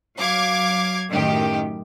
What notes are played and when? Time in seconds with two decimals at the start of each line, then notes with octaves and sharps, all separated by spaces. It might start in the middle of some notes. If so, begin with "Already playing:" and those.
0.17 F#3 F5 D6 G#6
1.09 F#2 A2 D#3 G4